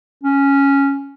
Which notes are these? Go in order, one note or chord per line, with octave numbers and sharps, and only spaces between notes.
C#4